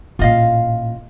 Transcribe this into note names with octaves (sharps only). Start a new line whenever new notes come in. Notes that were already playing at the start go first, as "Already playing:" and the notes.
A1 A#2 F4 D#5 F5